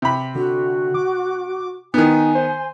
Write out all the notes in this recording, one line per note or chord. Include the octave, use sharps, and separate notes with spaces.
C3 B5
D3 F#4
D6
D#3 B3 D#4 G#5
C5